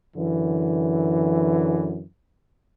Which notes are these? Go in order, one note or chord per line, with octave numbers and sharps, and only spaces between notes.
F#2 D3 E3